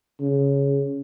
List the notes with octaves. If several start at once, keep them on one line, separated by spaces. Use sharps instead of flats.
C#3